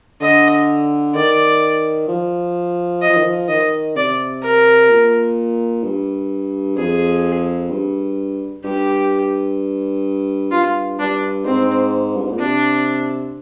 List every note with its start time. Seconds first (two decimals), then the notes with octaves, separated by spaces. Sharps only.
0.21 D3 D#5
1.14 D#3 D5
2.08 F3
3.02 D#5
3.09 F3
3.17 D#3
3.24 F3
3.49 D#3 D#5
3.96 C3 D5
4.42 A#4
4.90 A#2
5.84 G2
6.77 F2 G#4
7.70 G2
8.64 G2 G4
10.51 G2 F4
10.99 G2 D4
11.45 G#2 C4
12.17 G2
12.24 G#2
12.32 A#2
12.40 C3 D4